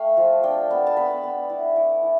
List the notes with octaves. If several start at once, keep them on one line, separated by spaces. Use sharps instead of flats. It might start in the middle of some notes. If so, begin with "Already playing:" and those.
Already playing: A3 F5 G5
F3
D4 G5
B3
A5
B3 B5
B3
E4
E4
E4